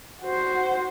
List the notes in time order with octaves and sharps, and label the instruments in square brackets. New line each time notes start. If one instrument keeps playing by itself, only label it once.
[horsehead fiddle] F#4 C5